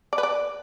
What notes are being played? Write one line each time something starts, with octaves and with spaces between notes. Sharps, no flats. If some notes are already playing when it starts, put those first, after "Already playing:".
D5
B4
D5